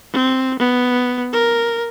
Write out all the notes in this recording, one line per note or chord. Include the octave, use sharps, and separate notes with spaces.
C4
B3
A#4